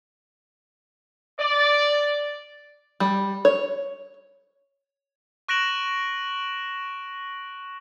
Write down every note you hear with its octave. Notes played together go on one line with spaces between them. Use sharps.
D5
G3
C#5
C#6 F#6 A#6 D7 E7 F#7